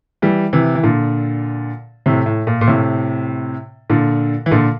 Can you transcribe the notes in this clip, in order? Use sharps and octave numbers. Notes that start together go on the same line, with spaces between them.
E3 G3
C3 E3
E3
A#2 D3
A2 C3
A2
A#2
A#2
A2 C3
A#2 D3
E3
A#2 D3